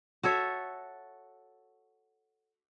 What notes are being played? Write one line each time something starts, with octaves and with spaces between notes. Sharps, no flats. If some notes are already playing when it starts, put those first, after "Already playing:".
F#4 A4 C#5 E5